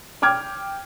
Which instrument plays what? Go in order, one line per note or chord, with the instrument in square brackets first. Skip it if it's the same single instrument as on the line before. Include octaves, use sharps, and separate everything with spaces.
[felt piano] G5 D6 F6 G#6